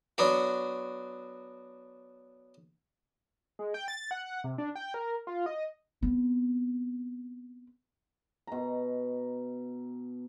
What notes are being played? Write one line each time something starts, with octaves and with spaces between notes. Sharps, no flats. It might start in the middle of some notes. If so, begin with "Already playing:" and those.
F#3 B3 D4 F#4
G#3
G5
A6
F#5
C3
D4
G5
A#4
F4
D#5
B3 C4
B2 A#5